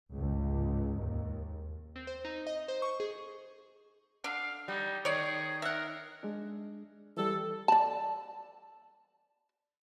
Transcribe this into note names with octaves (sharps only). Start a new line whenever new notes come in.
G1 C#2 G#2
D#2 G#2
C4
C5
D#4
D#5
C5
C#6
G#4
D3 F5
G3 D#4
D#3 G#4 C#5 D5
A#4 E5 F#5
G#3 D4
E3 G3 A4
D5 A5